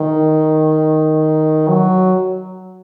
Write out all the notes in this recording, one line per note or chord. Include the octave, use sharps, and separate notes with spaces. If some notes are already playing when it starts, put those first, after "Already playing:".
Already playing: D#3
F#3